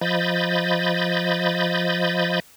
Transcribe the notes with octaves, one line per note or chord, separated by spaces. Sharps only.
F3 D#5 B5 G6 A6